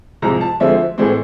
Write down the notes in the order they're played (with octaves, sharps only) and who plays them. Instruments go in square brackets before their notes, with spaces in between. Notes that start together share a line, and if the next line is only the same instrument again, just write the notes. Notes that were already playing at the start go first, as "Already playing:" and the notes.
[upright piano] C2 C3 F3 G#3 A#5
A5
D2 D3 F3 G#3 C4 E5
A2 E3 G#3 C4